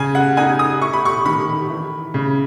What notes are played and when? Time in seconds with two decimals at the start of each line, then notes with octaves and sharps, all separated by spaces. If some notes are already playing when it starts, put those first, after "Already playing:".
Already playing: C#3 G#5
0.15 F#5
0.37 D#4 G#5
0.59 D#6
0.81 E4 C#6
0.93 B5
1.05 C#6
1.25 D#3 B5
1.70 E3
2.14 C#3